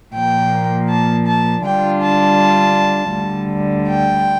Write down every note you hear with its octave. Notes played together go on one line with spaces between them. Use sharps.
A#2 F3 A#3 G5
A5
A5
D3 G3 D4 F4 G5
A5
D2 D3 G3
G5